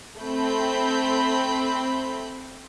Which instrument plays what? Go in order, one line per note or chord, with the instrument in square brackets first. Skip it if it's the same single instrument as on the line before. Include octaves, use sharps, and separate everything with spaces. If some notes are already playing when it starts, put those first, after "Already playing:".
[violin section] A3 B5 G6 [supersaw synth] C4